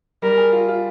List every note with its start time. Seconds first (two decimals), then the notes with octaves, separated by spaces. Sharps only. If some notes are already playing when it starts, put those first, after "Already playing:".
0.22 G3 A#4
0.37 G#4
0.52 F4
0.68 F4